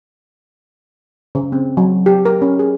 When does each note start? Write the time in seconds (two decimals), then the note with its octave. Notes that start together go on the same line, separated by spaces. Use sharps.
1.35 C#3
1.52 C4
1.77 F#3
2.06 G4
2.25 A#4
2.42 C#4
2.59 G#4